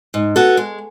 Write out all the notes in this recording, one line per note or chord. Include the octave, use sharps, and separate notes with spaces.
G#2
B3 F#4 A4
G#3